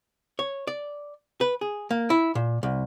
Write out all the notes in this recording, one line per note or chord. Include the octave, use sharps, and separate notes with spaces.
C#5
D5
B4
G#4
A#3
E4
A#2
C2